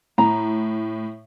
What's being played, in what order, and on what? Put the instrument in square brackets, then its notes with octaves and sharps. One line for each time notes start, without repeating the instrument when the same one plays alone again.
[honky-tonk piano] A2 [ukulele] A#5